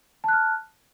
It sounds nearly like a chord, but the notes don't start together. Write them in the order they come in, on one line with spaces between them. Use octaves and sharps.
A5 F#6 F6